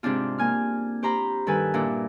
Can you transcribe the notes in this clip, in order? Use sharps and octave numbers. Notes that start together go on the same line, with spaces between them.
G#2 C3 C4 D4 F4
A#3 G#5 F6
G4 C5 A#5 B5
G2 D#3 A4 B4 G#5
A#2 D4 E4